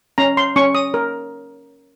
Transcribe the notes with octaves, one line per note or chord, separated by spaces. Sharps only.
C#4 A#5
C6
C#4 C#6
D#6
A#4